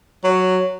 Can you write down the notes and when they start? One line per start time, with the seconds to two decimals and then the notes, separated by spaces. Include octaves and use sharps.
0.24 F#3